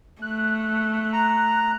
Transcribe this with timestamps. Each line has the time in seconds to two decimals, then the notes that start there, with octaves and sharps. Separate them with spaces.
0.22 A3 F#6
1.13 A#5